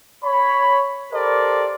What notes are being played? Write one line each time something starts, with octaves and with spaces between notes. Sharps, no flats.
C#5 B5
G4 A4 A#4 C5 D5